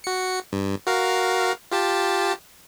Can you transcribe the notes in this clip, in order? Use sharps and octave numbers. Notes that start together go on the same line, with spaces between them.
F#4 C#7
G2
F#4 A#4 F5
F4 G4 A5